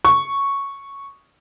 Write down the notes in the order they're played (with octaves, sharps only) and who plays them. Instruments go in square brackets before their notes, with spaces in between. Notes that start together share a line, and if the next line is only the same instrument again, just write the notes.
[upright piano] C#6